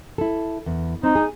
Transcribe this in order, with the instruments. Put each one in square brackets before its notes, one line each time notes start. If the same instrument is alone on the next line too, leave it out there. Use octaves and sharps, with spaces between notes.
[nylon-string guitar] E4 A4
E2
[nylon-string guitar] C4 [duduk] D#4
[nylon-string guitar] G#4